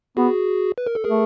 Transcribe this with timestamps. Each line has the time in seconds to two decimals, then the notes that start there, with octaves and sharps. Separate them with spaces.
0.17 B3 F#4 G#4
0.78 B4
0.87 A#4
0.95 A4
1.04 A3 G#4 A#4